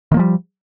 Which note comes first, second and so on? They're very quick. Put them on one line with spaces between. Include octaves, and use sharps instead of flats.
D#3 A#3 F3 G3